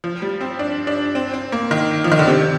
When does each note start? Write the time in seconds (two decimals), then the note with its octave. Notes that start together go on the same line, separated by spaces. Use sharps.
0.04 F3
0.22 G3
0.41 C4
0.59 D4
0.87 D4
1.15 C4
1.34 C4
1.52 A#3
1.71 D#3
2.04 F3
2.12 D#3
2.19 D3
2.27 C3